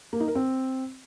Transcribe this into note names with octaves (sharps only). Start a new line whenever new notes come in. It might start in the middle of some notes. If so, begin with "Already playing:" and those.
A#3
D#4
A#4
C4